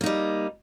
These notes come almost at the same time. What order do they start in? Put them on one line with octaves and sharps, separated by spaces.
A#3 D#4 G3